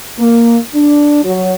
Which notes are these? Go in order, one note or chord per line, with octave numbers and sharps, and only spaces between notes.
A#3
D4
F#3